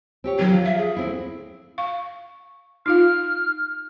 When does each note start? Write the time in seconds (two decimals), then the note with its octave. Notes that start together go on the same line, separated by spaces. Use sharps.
0.24 C4 G4 C#5
0.39 D#3 F#3 G3
0.51 F3
0.65 E5
0.77 G#4
0.97 D2 C4 E4
1.78 F5 C#6
2.86 D#4 F4 F5 F6